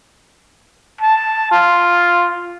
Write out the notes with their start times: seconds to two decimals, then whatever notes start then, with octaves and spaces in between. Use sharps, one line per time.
1.01 A5
1.52 F4